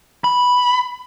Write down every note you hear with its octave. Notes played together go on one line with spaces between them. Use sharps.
B5